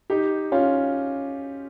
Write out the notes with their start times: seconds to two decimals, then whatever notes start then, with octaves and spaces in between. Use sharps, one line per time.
0.10 D#4 G4
0.52 C#4 F4